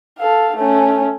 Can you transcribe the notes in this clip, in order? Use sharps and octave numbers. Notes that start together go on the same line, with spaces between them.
A4 F5
A3 C#4